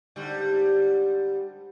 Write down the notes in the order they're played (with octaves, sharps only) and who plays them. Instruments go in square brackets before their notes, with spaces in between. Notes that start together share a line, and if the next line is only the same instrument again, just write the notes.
[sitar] G#2 D3 G3